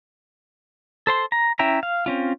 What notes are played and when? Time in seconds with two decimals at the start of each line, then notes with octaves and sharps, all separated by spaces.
1.07 A4 C5 C6
1.32 A#5
1.59 C#4 E4 E5 G5 A#5
1.83 F5
2.06 C4 C#4 F4